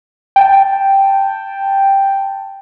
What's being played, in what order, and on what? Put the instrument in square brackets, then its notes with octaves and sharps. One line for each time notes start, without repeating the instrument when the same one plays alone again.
[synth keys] G5 A5